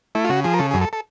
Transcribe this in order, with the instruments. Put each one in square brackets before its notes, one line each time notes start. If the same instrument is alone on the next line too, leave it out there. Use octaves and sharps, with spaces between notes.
[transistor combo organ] A3 E4
F4
C#3 F#4
F3 G#4
A#4
C#3 A4
G#4
F#2
A4
A4